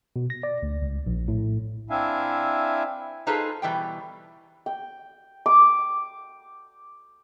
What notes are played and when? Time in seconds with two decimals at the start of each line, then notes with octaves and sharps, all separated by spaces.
0.16 B2
0.30 A#6
0.43 D5
0.63 D2
0.82 C#2
1.06 A#1
1.28 A2
1.90 C4 D4 E4 E5 F5 G#5
3.27 D#4 F4 G#4 A4 B4 C5
3.62 B2 E3 G3 G5
4.66 G5
5.46 D6